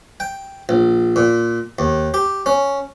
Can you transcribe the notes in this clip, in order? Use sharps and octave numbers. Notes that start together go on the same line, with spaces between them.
G5
A#1
A#2
D#2
G4
C#4